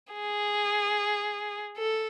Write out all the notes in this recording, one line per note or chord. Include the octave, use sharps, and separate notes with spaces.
G#4
A4